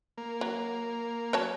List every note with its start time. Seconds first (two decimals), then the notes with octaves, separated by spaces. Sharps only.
0.18 A#3
0.41 F#3
1.33 F#3 C#5 A5